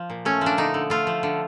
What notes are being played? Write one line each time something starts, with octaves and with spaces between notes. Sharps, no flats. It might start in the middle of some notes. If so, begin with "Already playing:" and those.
Already playing: F3
A#2
A3 C#4
F3 D4
D3 D#4
D3
A3 F4
F3
D3